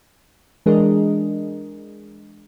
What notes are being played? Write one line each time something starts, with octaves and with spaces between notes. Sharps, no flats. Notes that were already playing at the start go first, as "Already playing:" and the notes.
E3 G#3 D4 G#4 A#4 D#5